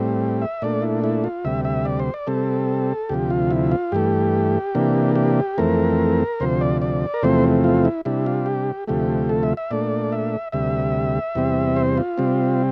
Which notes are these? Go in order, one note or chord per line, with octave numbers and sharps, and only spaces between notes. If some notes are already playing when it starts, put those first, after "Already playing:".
Already playing: A2 G3 C4
E5
A#2 A3 D4 D5
E4
E4
F4
D2 C3 G3 E5
E5
D5
C5
D5
C3 G3 C4 A4
D2 C3 F3 G4
F4
E4
F4
G2 E3 A3 G4
C3 E3 A#3 D4
G4
F2 E3 A3 C4 A#4
D2 C3 F3 C5
D5
D5
A#4
E2 C3 F3 A3 C4 C5
F4
E4
C3 G3 D4 E4
F4
G4
D2 C3 F3 A3 G4
A4
E5
E5
A#2 A3 D4 D5
E5
D2 C3 G3 E5
E2 C3 G3 C4
C5
F4
C3 G3 C4